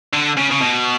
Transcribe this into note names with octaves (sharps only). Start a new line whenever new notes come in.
D3
C#3
C#3
B2